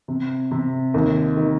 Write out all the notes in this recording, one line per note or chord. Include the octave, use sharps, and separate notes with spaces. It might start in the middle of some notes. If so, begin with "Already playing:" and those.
C3
C3
D#2
D#3